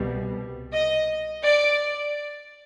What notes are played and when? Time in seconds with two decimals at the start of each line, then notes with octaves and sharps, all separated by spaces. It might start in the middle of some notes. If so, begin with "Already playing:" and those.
Already playing: C2 B2 G3
0.73 D#5
1.43 D5